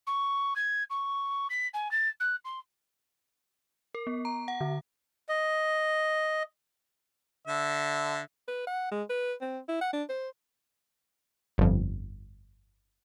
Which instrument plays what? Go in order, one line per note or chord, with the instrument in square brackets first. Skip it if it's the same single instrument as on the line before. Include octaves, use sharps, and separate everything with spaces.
[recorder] C#6
G#6
C#6
B6
G#5
A6
F#6
C6
[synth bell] A#4
B3
A#5
F#5
D3
[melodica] D#5
[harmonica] D3 E5
[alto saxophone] B4
F#5
G#3
B4
C4
E4
F#5
D4
C5
[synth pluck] G1 F2